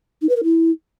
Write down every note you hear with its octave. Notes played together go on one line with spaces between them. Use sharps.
D#4
B4
A#4
E4